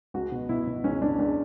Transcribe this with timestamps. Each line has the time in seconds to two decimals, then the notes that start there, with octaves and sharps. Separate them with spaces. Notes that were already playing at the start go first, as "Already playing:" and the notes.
0.14 C#2 F#4
0.32 B2
0.49 B2 E4
0.67 B2
0.84 C#2 C#4
1.02 C#2 D4
1.19 C#2 D4